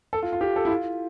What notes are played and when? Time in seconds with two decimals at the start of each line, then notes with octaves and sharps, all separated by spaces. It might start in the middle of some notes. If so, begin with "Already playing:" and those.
0.13 A4
0.23 F4
0.33 F4
0.41 G4
0.56 A4
0.65 E4
0.70 F4